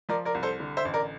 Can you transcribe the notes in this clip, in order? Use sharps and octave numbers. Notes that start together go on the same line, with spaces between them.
F3 A#4 D5
A#4 D5
C2
A4 C5
D3
C5 E5
A1
A#4 D5